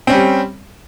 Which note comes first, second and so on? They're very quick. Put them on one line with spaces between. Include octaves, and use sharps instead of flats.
C4 C#4 G3